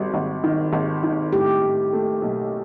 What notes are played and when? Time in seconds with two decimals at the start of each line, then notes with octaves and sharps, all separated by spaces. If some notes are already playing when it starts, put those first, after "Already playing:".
Already playing: G#1 G3 F#4
0.14 G#1
0.44 D#3
0.73 G#1
1.03 D#3
1.33 A2 G4
1.62 A2
1.93 A3
2.22 B1